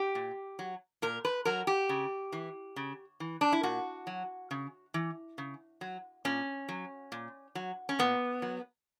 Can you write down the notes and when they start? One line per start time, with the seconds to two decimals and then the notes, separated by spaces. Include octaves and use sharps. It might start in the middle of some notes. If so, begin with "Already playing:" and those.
Already playing: G4
0.15 A#2
0.59 F#3
1.02 A#2 A#4
1.25 B4
1.45 F#3 A#4
1.67 G4
1.89 C#3
2.32 E3
2.76 C#3
3.20 E3
3.41 D4
3.53 E4
3.63 A#2 F#4
4.07 F#3
4.51 C#3
4.94 E3
5.38 C#3
5.81 F#3
6.25 A#2 C#4
6.69 F#3
7.12 A#2
7.55 F#3
7.89 C#4
7.99 A#2 B3
8.42 F#3